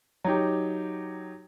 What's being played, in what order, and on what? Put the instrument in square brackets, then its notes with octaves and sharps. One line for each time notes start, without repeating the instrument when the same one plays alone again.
[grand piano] F#3 D#4 G4